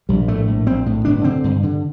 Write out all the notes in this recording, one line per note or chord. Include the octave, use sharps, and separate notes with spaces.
A#1 G3
A2 A3
A#1
A#1 C4
A2
G1 D4
D3 C4
G2
D3